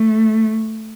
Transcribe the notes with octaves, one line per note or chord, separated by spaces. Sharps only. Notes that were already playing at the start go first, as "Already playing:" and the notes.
Already playing: A3